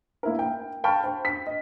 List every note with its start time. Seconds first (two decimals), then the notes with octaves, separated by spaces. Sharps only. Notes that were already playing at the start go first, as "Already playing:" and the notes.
0.23 A#3 E4 A#4
0.39 G5
0.84 F5 G5 A5 B5 C#6 F6
1.04 C5 G5
1.25 B6
1.47 D#5